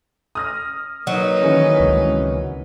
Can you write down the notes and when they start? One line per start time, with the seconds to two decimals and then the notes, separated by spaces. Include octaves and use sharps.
0.35 D#6 F6 A#6
1.07 F#3 A#3 D#4 B4
1.42 D#3 E3 C#4
1.80 C#2 C3 G#3